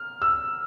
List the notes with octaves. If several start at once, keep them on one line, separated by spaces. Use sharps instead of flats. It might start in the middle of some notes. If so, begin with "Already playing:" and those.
Already playing: F6
E6